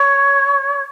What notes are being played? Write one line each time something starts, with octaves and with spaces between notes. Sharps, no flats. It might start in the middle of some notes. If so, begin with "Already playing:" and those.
Already playing: C#5